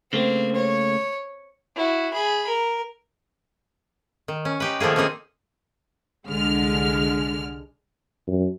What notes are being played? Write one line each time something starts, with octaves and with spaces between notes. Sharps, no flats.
C#3 A3 A#3 C4
C#5
E4 F#4
G#4 B5
A#4
D#3
C#4
D#4 G4 B4
D#3 F3 A3 A#3 G#4
A#3 C4 C#4 D#4 G#4
C2 D3 G#3 F6
F#2